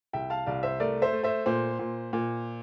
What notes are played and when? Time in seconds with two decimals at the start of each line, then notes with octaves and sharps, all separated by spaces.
0.13 C2 E5 G5
0.30 F5 A5
0.46 C2 D5 F5
0.63 C5 E5
0.80 A3 A#4 D5
1.02 C5 E5
1.13 A3
1.23 C5 E5
1.46 A#2 C5
1.79 A#2
2.13 A#2